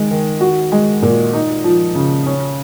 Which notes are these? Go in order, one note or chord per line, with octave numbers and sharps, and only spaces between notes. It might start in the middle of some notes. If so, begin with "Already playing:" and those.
Already playing: D#3 G#3
D#3
F#4
G#3
A#2
D#4
F3
C#3
C#4